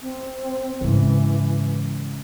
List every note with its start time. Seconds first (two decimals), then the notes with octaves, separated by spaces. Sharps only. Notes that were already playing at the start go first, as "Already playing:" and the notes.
0.02 C4
0.81 G#2 C#3 E3